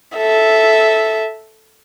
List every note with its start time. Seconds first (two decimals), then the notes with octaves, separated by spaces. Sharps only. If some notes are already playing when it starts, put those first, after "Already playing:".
0.17 A4 E5